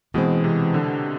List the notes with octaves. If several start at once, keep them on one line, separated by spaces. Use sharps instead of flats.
B2 E3 G#3 C4
C3
D3